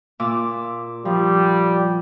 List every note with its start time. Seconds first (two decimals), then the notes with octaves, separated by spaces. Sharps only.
0.20 A#2 D6 E6
1.05 F3 G3